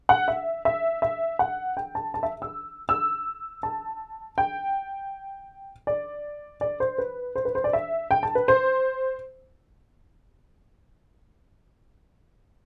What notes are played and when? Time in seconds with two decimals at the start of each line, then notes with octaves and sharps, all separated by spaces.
0.09 F#5
0.28 E5
0.65 E5
1.02 E5
1.39 F#5
1.77 G5
1.95 A5
2.14 A5
2.23 E5
2.42 E6
2.89 E6
3.63 A5
4.38 G5
5.87 D5
6.61 D5
6.80 C5
6.98 B4
7.36 C5
7.45 B4
7.55 C5
7.64 D5
7.73 E5
8.11 G5
8.23 A5
8.35 B4
8.48 C5